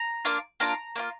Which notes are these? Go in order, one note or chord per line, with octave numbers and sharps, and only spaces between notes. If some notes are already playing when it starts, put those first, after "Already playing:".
Already playing: A#5
A#3 D4 F4
A#3 D4 F4 A#5
A#3 D4 F4